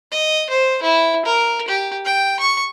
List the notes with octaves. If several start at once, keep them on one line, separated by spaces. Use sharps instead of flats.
D#5
C5
E4
A#4
G4
G5
C#6